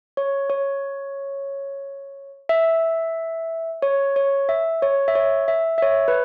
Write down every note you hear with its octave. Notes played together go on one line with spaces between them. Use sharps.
C#5
C#5
E5
C#5
C#5
E5
C#5
E5
C#5
E5
E5
C#5
B4